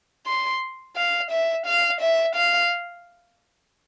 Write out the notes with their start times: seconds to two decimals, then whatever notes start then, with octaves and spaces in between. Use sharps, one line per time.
0.27 C6
0.97 F5
1.31 E5
1.67 F5
2.01 E5
2.36 F5